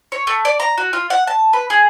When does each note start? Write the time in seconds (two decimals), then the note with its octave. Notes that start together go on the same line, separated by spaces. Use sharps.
0.12 C#5
0.27 A3
0.45 D5
0.60 A#5
0.78 F#4
0.93 F4
1.10 F#5
1.27 A5
1.53 B4
1.70 G#4